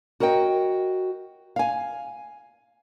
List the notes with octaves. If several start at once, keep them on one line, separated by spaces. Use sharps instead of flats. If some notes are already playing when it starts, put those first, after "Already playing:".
F#4 A#4 C#5 D#5 G5
F5 G#5